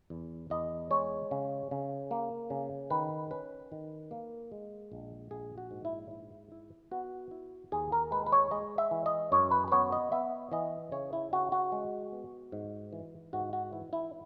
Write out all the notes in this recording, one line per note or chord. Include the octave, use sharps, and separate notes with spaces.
E2
E2 D#5
G#3 C#5
C#3
C#3
A#3
C#3
D#3 B4
C#4 B4
D#3
A#3
G#3
A#1
A#1 G#4
F#4
G#2
E4
E4
E4
B3 F#4
E4
D#2 G#4
A#4
G#3 B4
B4
C#5
G#3 D#5
E5
E3
D#5
F#2 C#5
B4
B4
B3 C#5
D#5
B3 E5
E3 D#5
C#3 C#5
E4
C#3 F#4
F#4
G#3
B3
G#2
E3
G#2 F#4
F#4
E3 E4
E4